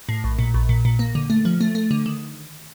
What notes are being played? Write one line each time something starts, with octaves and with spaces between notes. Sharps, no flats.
A2
A#1
A#2
A#1
A#2
A#2
A#3
D3
A3
F3
A3
A3
D3
D#3